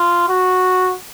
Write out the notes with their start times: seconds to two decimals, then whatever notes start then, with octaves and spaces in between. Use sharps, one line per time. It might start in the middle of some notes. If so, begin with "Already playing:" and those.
Already playing: F4
0.29 F#4